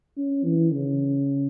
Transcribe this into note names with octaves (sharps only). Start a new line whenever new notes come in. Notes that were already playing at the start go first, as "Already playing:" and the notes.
C#4
E3
C#3